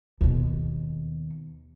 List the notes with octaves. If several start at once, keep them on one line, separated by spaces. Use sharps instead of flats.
D#2 B2